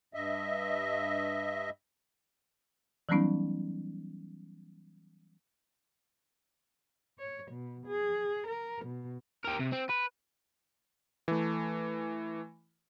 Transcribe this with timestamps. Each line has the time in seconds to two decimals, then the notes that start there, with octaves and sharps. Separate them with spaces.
0.14 G2 D#5 E5
3.09 E3 F#3 G3 B3 C#4 D#4
7.19 C#5
7.51 B2
7.87 G#4
8.47 A#4
8.86 B2
9.45 G4 A#4
9.60 C3
9.73 C4
9.90 B4
11.28 E3 A3